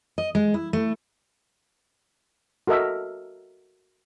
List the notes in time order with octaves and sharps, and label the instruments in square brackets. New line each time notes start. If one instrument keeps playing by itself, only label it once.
[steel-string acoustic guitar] D#5
G#3
E4
A3
[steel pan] F#4 A4 A#4 D#5 E5